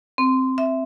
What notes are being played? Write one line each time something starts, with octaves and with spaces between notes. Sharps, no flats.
C4
E5